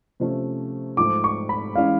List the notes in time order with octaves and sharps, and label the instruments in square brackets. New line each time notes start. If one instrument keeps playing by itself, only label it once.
[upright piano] C3 F3 A3 C#4
[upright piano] G#2 F3 A3 [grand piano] D6
[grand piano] C#6
B5
[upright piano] E3 G#3 C#4 [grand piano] F5